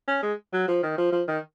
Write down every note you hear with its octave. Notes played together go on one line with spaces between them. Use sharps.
C#4
G#3
F#3
F3
D#3
F3
F3
D#3